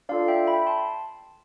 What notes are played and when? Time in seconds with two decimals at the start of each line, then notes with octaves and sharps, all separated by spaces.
0.09 D4 F4 A4 D5 F5
0.28 E5 G5
0.47 G5 B5
0.67 A5 C6